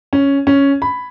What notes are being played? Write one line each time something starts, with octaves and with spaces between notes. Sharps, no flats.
C#4
C#4
B5